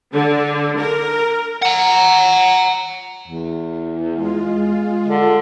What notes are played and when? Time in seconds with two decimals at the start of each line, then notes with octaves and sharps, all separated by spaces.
0.12 D3
0.77 A#4
1.62 F#5 A#5
3.28 E2
4.15 G#3 F4
5.08 D3